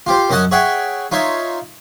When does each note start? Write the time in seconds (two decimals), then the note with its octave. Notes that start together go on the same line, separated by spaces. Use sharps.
0.07 F4 G4 C5
0.30 F#2 C#4 D#5 F#5 A5 D#6
0.51 G#4 C#5 E5 F#5 G5
1.12 D#4 F4 C#5 E5